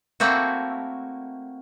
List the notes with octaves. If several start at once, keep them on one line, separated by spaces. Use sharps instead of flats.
A3 A#3 C4 E4 F#4